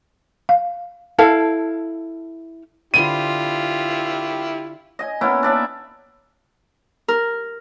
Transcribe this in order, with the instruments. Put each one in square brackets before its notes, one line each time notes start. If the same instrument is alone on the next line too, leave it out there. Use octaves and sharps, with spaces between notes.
[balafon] F5
[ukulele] E4 A4 F5 [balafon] A5
[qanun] D3 B4 C5 [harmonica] E4 G4 [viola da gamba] F4 [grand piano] D#7
[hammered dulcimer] D#5 G#5
A#3 B3 C#4 E4
D4 D5 E5
[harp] A#4